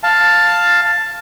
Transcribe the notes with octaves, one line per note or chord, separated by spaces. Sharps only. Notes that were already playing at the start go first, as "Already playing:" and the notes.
F5 A5